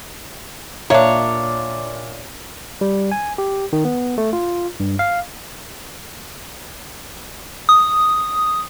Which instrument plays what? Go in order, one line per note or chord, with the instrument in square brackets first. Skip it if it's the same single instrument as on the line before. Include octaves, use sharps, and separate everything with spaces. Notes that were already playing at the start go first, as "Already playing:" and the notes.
[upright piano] A#2 E5 F5 [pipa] A#3 D4 [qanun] C#5
[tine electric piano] G3
G#5
G4
D#3
B3
A3
F4
G2
F5
[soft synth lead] D#6